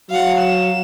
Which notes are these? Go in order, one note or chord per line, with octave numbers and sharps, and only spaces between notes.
F#3 F5 F#5
E7